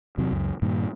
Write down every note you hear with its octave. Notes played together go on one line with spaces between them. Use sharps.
E2 C3 F#3
C#2 F#2
G2 A#2 D#3